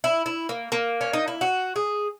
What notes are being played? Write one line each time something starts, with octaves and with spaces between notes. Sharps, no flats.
E4
E4
A#3
A#3
C#4
D#4
E4
F#4
G#4